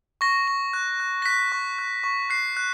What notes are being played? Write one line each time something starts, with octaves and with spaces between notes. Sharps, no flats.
C#6 A#6
C#6
F#6
F#6
A#6
F#6 B6
C#6
F#6
C#6
F#6 C7
F#6